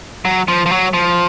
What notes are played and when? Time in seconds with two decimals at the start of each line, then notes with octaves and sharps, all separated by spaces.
0.25 F#3
0.48 F3
0.66 F3
0.71 F#3
0.93 F3